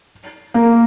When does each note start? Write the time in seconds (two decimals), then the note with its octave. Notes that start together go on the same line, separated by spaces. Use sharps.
0.54 A#3